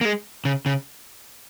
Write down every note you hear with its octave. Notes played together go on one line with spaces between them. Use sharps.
A#3
G#3
C#3
C#3